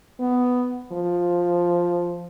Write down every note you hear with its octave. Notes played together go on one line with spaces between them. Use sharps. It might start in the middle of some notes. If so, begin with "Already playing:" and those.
B3
F3